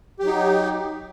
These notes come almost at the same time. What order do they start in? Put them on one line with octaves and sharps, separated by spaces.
G4 F#3 D#4